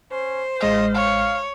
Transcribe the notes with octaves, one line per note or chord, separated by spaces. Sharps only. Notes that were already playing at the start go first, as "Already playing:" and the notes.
C#4 C5
A1 G#3 F4 D#5 F6
C#5 F5